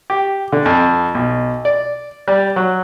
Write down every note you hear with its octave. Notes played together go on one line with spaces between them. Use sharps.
G4
D3
F2
B1
D5
G3
F#3